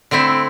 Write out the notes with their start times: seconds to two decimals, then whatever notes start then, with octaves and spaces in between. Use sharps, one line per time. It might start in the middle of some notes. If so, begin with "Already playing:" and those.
0.11 D3 A3 C4 E4